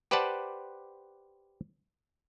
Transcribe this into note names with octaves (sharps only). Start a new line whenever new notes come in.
G4 B4 C5 D5 F#5 A5